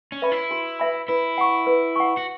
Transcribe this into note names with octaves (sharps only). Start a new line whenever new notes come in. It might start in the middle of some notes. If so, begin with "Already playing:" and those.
C#4
B4 E5 B5
E4
F#4
B4 E5 B5
E4 B4
F#5 C#6
B4
F#5 C#6
F#4